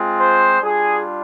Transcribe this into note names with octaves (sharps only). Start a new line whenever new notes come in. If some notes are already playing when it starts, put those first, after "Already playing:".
Already playing: G#3 C4 F4
C5
G3 D4 F4 G#4